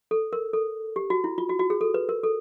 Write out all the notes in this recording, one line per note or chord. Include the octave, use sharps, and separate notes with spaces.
A4
A#4
A4
G4
F#4
E4
F4
F#4
F#4
G#4
A4
B4
A#4
A4